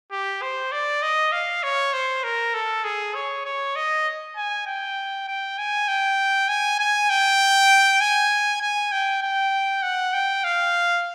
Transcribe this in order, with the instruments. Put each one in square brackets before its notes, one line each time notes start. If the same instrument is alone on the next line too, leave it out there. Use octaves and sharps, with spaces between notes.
[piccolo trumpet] G4
C5
D5
D#5
F5
C#5
C5
A#4
A4
G#4
C#5
C#5
D#5
G#5
G5
G5
G#5
G5
G#5
G#5
G5
G#5
G#5
G5
G5
F#5
G5
F5